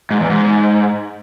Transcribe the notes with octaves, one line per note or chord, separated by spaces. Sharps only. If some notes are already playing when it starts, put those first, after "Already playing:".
G#2
E2
G#2